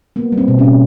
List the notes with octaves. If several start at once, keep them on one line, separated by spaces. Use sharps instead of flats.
A#3 B3
G3
C4
B2
B2 C#4